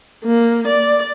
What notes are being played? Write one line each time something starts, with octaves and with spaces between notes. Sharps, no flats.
A#3
D5